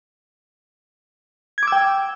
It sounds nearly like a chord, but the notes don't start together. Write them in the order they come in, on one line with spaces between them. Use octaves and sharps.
G#6 D6 E6 G5